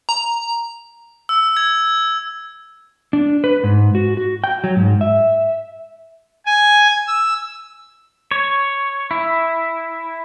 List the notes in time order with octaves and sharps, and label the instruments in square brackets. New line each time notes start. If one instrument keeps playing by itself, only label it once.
[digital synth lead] A#5
[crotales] E6
G#6
[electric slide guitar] D4
B4
G#2
F#4
F#4
G5
F#3
G#2
E5
[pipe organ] G#5
E6
[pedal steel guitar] C#5
E4